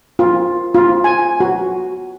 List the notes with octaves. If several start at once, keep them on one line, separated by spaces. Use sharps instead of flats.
F4
F4
G#5
F#4